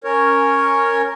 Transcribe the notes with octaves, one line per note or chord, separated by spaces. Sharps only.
C#4 A#4 C#5